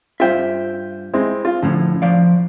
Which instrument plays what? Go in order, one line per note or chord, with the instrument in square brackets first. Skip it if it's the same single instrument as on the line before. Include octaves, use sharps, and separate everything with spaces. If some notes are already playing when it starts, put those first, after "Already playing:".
[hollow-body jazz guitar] G2 C5 E5 [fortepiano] F4 G5
[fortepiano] G#3 C4 E4
F4
[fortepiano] A2 [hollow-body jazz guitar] D3 F3 C#4
[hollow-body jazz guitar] F3 D5 F5